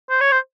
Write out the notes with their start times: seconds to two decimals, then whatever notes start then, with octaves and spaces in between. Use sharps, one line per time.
0.10 C5
0.21 C#5
0.31 C5